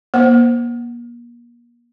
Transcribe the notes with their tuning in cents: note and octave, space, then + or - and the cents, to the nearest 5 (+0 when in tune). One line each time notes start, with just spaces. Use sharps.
A#3 +35 C5 +0